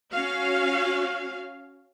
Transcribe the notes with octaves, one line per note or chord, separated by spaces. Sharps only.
C#4 F#4 F5